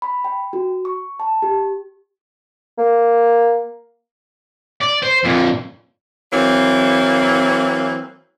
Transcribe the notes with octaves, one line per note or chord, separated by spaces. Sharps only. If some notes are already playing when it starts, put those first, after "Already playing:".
B5
G5
F#4
C#6
A5
G4
A#3
D5
C5
F2 A#2
E3 F#3 A#3 C4